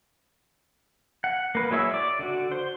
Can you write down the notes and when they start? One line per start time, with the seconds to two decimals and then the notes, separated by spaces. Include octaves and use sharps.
1.24 F#5
1.55 A#3 B4
1.70 F#3 G#3 E4 C#5 E5
1.94 D5 D6
2.19 D3 F#4
2.52 C5